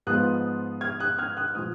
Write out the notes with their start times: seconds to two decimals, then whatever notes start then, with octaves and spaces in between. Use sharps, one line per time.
0.07 G#2 F3 B3 F4 D#6 F#6
0.81 F6 G#6
1.00 D#6 F#6
1.18 F6 G#6
1.37 D#6 F#6
1.55 A#2 F3 D#6 F#6